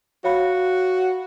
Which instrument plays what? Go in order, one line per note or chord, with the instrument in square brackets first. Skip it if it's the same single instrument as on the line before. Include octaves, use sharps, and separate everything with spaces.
[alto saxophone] F#4 [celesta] C#5 F5 B5